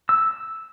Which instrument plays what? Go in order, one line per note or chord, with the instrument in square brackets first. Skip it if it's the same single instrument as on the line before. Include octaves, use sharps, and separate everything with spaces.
[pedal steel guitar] E6